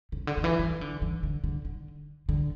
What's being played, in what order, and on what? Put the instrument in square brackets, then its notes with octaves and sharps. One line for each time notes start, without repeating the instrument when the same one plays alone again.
[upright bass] C#3
D3
D3
E3
E3
D3
E3
D3
D3
D3
D3